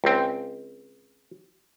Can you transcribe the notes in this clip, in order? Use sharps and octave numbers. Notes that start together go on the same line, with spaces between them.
C#2 C4